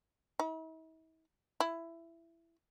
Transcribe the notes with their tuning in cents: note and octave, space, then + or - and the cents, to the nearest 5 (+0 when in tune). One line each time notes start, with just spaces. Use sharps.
E4 -45
E4 +15